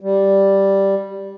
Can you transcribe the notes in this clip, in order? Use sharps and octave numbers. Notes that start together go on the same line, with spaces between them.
G3